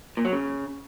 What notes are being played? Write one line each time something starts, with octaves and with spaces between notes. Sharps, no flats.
A#2
F#3
C#3